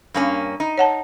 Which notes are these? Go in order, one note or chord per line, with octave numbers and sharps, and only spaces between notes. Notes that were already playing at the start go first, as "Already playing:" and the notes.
G2 A#3 C#4
D#4
C#5 F#5 A5